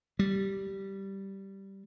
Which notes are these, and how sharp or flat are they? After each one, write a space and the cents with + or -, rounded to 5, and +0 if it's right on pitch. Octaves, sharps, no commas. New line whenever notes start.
G3 -10